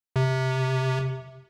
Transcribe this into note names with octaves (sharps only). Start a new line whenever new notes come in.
C3